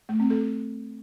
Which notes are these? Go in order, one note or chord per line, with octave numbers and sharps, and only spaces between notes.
A3
C4
A4